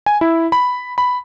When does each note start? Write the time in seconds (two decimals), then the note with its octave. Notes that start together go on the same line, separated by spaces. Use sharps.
0.06 G#5
0.21 E4
0.52 B5
0.98 B5